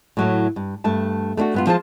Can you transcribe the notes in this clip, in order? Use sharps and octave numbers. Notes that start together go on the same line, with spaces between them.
A2 F#3 A3
G2
G2 A3 A5
A3 B3 D4 F#4
G2 B3 F4
F3 F4 G#4 C5 D5 A5